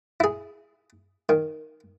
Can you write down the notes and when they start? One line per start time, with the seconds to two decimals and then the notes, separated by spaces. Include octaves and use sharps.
0.20 E4 G#4
1.29 D#3